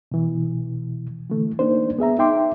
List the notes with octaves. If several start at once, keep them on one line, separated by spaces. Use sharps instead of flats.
B2 E3
D3 E3 A3
A#3 D4 D#4 C5
B3 G#4 E5 A#5
D#4 E5 G5 C6 D6